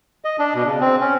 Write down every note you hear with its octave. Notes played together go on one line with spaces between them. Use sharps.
D#5
D4
B2
C#3
C4
C#4